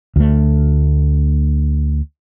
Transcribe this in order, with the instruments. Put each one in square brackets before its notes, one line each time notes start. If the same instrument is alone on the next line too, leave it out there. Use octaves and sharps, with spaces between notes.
[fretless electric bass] D2 A3